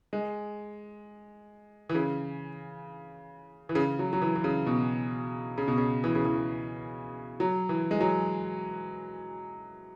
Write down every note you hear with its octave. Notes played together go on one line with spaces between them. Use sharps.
G#3
E3
C#3
E3
C#3
F#3
F#3
E3
E3
C#3
B2
C#3
B2
C#3
E3
C#3
E3
F#3
E3
G#3
F#3